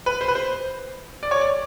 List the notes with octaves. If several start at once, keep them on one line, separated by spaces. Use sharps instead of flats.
B4
C5
B4
C5
D5
C#5
D5